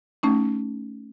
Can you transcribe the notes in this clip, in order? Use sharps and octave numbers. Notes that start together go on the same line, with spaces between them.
A3 C#4 D#4